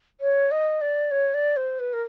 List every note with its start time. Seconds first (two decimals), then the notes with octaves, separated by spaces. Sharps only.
0.20 C#5
0.51 D#5
0.81 D5
1.11 C#5
1.34 D5
1.56 C5
1.79 B4
1.93 A#4